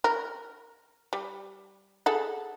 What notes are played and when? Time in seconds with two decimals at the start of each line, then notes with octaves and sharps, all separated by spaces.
0.04 A#4
1.13 G3
2.06 G#4 A4 F#5